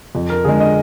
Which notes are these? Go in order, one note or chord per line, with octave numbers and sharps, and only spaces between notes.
F2
A#4
D3 G#3 G#4
D#5